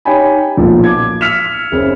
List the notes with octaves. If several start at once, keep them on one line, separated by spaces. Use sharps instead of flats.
D#4 G4 C#5 G5 G#5 B5
B1 A#2 F3
D6 G#6
E6 F6 B6 C#7 E7 F7
F#1 C#3 C4 G#4